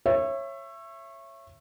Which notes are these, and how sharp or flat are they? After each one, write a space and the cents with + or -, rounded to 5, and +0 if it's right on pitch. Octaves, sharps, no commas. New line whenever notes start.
C#5 -20 E5 +20